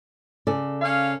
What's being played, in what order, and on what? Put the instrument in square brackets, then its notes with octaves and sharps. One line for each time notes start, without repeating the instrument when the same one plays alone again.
[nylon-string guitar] C#3 A4 D5
[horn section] C#4 F5